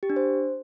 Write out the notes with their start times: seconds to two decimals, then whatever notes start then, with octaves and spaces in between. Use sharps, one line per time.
0.03 G4
0.10 D4
0.16 C5